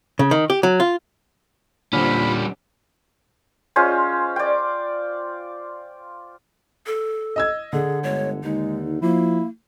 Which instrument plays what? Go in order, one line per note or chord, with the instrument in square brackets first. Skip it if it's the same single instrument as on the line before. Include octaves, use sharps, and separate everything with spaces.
[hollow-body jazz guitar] C#3
D#3
G4
F#3
F4
[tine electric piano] A#2 F6 [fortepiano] D3 C4 [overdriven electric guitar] G3 C#4 [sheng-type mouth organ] B5
[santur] G#3 C#4 F4 C5
D5 G5
[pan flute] A4
[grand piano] D#5 E6 G#6
[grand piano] D3 [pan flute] G#4
[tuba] G1 [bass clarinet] G#3 [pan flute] C#5
[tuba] D#2 [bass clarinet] G#3 [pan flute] D#4
[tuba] F3 [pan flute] A#3 [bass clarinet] E4